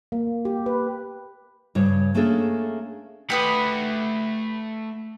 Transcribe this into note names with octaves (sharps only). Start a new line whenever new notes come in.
A#3
G4
B4
G2 C#3 C#5
A3 A#3 C#4 D4 G#4 A4
A3 G4 B4 F#5 D#6